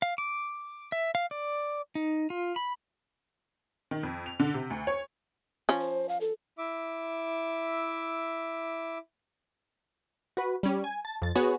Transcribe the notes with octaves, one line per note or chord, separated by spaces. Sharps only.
F5
D6
E5
F5
D5
D#4
F4
B5
D#3
F2
F7
D3
C3
D2
C#5
F3 C#4
C5
F5
A4
E4 E5 D6
F#4 B4
G3 C#4
G#5
A5
F2 A6
B3 F#4 G#4 B4 C#5